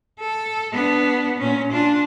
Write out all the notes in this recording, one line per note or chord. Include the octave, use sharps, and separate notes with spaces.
A4
B3 D4
A#2 C#4
D4 F4